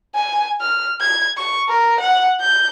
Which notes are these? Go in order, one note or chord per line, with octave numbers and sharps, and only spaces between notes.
G#5
F6
G#6
C#6
A#4
F#5
G6